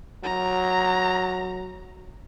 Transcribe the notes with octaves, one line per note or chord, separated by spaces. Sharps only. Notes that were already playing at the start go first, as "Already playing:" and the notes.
F#3 A#5